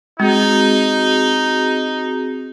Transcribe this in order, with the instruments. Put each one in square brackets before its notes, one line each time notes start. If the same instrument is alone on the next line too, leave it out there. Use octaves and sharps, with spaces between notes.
[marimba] G#3 [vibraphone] C4 F#4 G#4 [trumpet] D#4